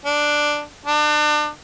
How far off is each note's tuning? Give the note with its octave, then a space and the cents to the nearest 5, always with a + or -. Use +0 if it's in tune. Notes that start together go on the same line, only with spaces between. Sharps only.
D4 +5
D4 +35